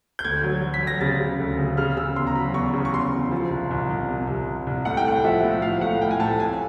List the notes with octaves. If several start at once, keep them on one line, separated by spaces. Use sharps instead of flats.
G6
D2 G#6
F#3
F#3
B6
F#3
A#6
C#3 A6
C#3
D2
C#3
C#3 F6
C#3 E6
E2 C6
A#5
F#3 B5
E2 C#6
C#3
C#6
E2 C6
E2
F3
C2
C2
C2
C3
C2
C2
C2
A2 F#5
G5
A3 F#5
F3 E5
A2
F3 F5
A2 F#5
A2 G5
G#5
A2 A5
F2 G#5